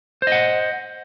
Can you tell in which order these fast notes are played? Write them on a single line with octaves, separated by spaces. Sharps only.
C5 D#5 F#5